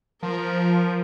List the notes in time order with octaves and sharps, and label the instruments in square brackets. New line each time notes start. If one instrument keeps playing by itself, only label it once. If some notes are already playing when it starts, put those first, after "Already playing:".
[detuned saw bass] F3 [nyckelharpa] A#4